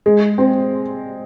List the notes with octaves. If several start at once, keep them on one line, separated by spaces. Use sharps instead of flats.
G#3
C4